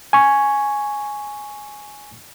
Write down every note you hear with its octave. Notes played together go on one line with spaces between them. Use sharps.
G#5 C#6